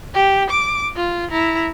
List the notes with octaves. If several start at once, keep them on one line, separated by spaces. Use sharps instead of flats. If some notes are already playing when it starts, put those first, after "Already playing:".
G4
D6
F4
E4 A#5